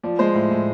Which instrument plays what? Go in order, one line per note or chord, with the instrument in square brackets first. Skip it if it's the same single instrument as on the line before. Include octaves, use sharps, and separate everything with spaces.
[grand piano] F3 D5
G#3 C5
A2
A2